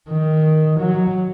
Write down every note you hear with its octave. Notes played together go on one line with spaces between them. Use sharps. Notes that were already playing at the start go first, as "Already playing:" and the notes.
D#3
F#3